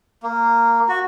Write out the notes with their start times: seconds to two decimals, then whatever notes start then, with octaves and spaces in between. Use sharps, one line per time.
0.23 A#3
0.89 F#4